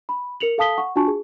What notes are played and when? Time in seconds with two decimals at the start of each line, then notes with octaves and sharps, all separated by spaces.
0.09 B5
0.40 A#4 C#7 F7 F#7
0.58 A4 F5 A5 D#6 B6 G7
0.78 F#5 C#6
0.96 D4 F4 F#4 G#5 A5 C#6
1.08 G#4